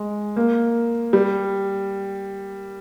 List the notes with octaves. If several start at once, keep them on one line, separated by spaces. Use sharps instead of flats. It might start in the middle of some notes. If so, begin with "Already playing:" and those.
Already playing: G#3
A#3
G3